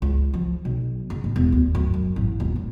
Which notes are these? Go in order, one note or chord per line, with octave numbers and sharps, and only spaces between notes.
C#2
F3
B1
F#1
A1
E1
D2
F#2
F#2
A1
D#1
A2